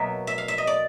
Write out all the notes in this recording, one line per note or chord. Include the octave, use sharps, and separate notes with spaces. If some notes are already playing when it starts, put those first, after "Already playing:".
Already playing: B2 F#3 A#3 E5
E5
F5
E5
D#5
D5